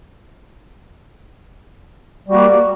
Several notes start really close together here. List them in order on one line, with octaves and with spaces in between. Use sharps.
G3 F#4 A#3